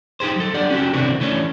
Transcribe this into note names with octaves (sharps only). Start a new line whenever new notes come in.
D#4 G4 G#4 C5
F#3 A4
D4 G4 D5 F#5
C#4 F#4 G4 A4
C3 D#3 E3 C4 D4 F#4
E3 A3 C#4 D4